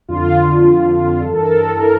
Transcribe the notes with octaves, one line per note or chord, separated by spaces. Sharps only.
F2 D3 F4
F2 D3
G2 E3 A4
A#4
A4
E3 A#4